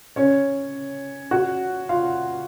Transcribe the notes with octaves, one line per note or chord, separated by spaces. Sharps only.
C#4 C#5
F#4 F#5
F4 F5